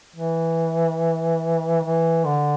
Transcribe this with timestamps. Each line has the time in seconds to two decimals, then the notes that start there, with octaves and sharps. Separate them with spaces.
0.16 E3
1.84 E3
2.25 D3